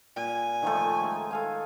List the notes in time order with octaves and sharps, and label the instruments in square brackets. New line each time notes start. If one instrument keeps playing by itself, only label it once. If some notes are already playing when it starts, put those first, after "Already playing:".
[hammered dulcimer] A#2 [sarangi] G#5
[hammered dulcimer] D#3 F3 A3
G#3 D#4
A4 F5 G#5